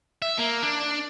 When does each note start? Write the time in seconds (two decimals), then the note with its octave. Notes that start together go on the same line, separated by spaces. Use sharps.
0.22 E5
0.39 A#3
0.63 D4